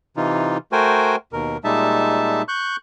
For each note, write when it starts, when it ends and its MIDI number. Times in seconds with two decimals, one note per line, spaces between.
0.17 0.57 48
0.17 0.57 52
0.17 0.57 63
0.17 0.57 65
0.72 1.16 57
0.72 1.16 66
0.72 1.16 70
0.72 1.16 72
0.72 1.16 79
0.72 1.16 80
1.33 1.57 39
1.33 1.57 47
1.33 1.57 70
1.64 2.42 46
1.64 2.42 55
1.64 2.42 56
1.64 2.42 63
1.64 2.42 76
1.64 2.42 81
2.48 2.76 85
2.48 2.76 90
2.48 2.76 91